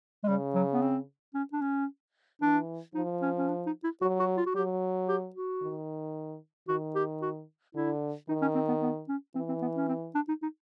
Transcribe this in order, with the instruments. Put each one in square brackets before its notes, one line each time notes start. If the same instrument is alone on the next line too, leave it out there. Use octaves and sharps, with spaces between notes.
[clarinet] G#3
[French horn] C#3 [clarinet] G3
[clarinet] F#3
B3
C4
C#4
D4
C#4
[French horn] E3 [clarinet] D4
[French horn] F3 [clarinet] D#4
[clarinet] C#4
C#4
D4
D#4
E4
[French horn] F#3 [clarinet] F#4
[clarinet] F#4
F4
F#4
[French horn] F#3 [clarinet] G4
[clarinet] G4
F#4
[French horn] D#3
[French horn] D#3 [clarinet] F#4
[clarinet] G4
F#4
[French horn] D3 [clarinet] E4
[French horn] D#3 [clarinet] D#4
[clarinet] C#4
C4
B3
B3
C#4
[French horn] E3 [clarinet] C4
[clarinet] C4
B3
C#4
C4
D4
D#4
D#4